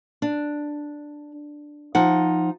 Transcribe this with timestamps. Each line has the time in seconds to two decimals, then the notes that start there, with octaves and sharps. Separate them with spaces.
0.22 D4
1.95 F3 D#4 F#5